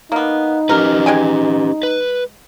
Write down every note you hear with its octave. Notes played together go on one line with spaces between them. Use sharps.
A#3 B3 D#4
C#4 G4 A#4 B4
G#3 G5 G#5
B4